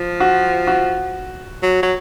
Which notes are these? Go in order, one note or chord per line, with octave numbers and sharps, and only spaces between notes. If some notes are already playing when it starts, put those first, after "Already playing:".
Already playing: F3
F#4
F#4
F#3
F#3